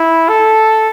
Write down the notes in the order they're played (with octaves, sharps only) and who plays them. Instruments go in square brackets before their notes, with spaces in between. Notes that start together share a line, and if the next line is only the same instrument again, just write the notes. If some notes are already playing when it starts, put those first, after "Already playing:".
Already playing: [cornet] E4
A4